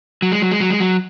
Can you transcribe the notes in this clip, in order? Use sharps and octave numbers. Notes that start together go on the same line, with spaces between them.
F#3
G#3
F#3
G#3
F#3
G#3
F#3